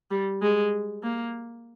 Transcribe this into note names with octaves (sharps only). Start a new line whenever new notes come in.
G3
G#3
A#3